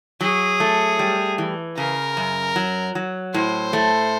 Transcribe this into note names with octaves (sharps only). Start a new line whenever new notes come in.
F#3 G#4
A3
G3
E3
C#3 A#4
F#2
F#3
F#3
A2 C5
A3